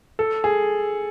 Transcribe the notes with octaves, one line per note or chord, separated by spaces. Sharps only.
A4
G#4